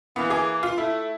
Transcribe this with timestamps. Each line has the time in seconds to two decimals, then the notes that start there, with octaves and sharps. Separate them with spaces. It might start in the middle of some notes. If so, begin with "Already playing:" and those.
0.16 E3 A#3 B3
0.30 G#4 D6
0.63 F4
0.78 A3 E4